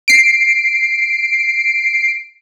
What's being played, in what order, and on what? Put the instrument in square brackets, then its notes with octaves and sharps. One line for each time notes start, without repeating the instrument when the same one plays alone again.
[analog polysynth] C7 D7